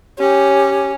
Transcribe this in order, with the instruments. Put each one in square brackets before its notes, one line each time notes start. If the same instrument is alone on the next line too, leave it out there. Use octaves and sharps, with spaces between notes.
[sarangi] C#4 [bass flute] G4